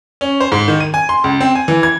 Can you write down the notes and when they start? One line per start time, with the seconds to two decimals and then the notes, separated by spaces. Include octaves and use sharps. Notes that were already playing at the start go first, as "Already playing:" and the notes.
0.21 C#4
0.40 C5
0.52 G#2
0.68 D#3
0.80 D#7
0.94 G#5
1.09 C6
1.24 C#2
1.41 C4
1.55 G#5
1.68 E3
1.83 G#6